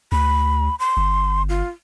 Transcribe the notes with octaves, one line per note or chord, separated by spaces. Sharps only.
D2 B5
C6
G1
F4